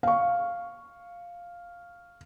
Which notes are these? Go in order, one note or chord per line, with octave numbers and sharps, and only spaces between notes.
F5 C#6